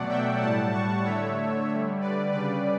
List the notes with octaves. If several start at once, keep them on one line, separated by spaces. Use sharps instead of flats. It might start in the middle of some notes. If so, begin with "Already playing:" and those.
Already playing: B2 F#3 A3 D5 F#5
E5 G5
A2 G3 F#5 A5
A5 C#6
D3 A3 C#5 E5
D3 G3
B4 D5
C#3 G3 B4 D5